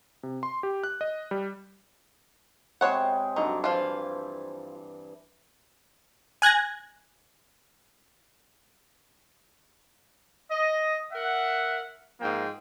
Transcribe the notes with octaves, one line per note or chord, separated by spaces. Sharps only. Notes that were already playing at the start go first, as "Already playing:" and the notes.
C3
C6
G4
F#6
D#5
G3
C3 G#3 C5 C#5 F#5 B5
G2 D3 F#3 D#4
E3 F3 F4
G#5 F#6 G#6 A#6
D#5
A#4 E5 F#5
G#2 F3 A#3 G5